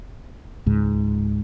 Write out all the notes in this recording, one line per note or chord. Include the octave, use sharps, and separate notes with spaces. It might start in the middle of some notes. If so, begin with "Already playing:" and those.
C#2 G#2